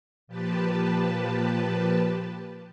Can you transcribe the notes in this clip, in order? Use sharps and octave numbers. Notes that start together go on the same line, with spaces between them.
A#2 F3 G4 B4 A5